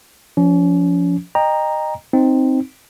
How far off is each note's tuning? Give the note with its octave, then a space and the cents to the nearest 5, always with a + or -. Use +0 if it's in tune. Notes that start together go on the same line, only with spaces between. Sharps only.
F3 +0 C#4 +40
D#5 -20 G5 +25 A#5 +0
C4 +0 D#4 +0